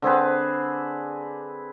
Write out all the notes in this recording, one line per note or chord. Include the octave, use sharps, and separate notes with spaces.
D3 C4 G#4 B4